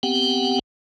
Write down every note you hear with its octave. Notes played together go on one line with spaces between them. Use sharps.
B3 C4 G4 F#5 G5